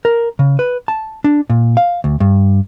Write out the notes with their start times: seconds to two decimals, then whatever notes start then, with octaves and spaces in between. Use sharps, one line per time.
0.05 A#4
0.39 C#3
0.59 B4
0.88 A5
1.24 D4
1.50 A#2
1.77 F5
2.04 D2
2.20 G2